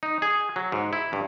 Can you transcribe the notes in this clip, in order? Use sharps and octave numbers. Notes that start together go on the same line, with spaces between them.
D#4
G#4
F#3
G#2
E4
G2